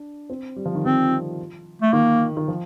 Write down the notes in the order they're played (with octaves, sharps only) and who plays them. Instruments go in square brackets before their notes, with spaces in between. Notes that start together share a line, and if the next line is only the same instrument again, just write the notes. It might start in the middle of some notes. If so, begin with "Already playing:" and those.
Already playing: [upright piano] D4
C4
G3
F3
D#3
[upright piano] F3 [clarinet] C4
[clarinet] A3
[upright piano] D#3 [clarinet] A#3
[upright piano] D#3
F3